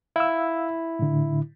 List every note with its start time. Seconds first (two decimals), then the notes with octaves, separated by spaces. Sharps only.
0.16 E4 F5 E6
0.99 A2 D3